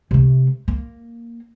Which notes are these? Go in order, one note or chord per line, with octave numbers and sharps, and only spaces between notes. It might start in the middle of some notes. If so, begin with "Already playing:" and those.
C3 A3
A#3